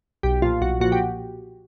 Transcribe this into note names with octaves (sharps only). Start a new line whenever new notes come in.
B1 G4
A#2 F3 F4
B1 F#4
A#2 F3 F#4
G4